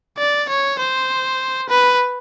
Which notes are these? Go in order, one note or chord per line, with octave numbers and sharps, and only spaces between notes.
D5
C#5
C5
B4